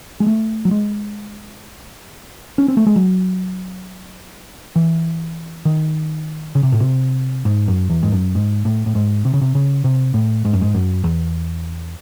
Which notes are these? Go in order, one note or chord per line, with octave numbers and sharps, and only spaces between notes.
G#3
A3
F#3
G#3
C#4
C4
A3
G#3
F#3
E3
D#3
C#3
C3
A2
C3
G#2
F#2
E2
G#2
F#2
G#2
A2
A2
G#2
C3
C#3
C3
C#3
C3
A2
G#2
F#2
G#2
F#2
E2